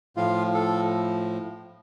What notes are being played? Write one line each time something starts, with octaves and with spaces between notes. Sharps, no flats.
A2 F3 F4
A4